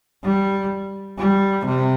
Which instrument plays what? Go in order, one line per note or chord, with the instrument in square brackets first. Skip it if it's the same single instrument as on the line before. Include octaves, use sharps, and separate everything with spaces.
[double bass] G3
G3
C3